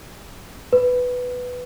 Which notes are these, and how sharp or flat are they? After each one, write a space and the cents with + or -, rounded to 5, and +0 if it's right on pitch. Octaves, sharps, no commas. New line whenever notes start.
B4 +5